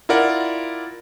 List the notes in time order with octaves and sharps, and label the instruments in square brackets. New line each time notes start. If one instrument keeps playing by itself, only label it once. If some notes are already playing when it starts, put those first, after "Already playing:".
[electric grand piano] E4 F4 A#4 D5 F#5